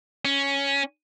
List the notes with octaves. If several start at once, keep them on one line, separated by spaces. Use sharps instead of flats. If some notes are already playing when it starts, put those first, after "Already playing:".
C#4